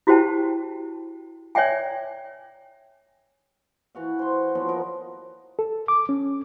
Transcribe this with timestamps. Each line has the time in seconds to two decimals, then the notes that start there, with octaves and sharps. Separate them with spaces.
0.07 E4 F#4 G4 C5 G5 A5
1.55 C#5 D5 E5 G5 G#5
3.95 E3 F#4 F5
4.19 C5 C6
4.55 F3 F#3 B3 F4
4.68 F3 D#4 A#4
5.59 A4
5.88 D6
6.09 C#4